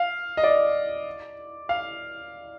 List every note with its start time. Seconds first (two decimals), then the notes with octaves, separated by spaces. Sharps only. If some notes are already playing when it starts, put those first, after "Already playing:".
Already playing: F5
0.37 D#5
0.44 D5
1.69 F5